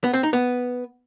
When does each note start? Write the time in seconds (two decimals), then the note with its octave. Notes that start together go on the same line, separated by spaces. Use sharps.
0.04 B3
0.13 C4
0.23 D#4
0.33 B3